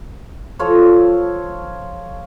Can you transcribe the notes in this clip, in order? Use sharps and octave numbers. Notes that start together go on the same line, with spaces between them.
F3 F4 A4 C#5